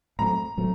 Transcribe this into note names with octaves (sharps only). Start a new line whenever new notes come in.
A2 F#3 A3 C4 A#5
A2 F#3 A3 C4